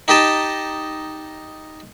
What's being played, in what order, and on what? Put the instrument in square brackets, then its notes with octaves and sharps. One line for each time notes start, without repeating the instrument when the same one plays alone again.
[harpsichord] D#4 G4 D#5 A5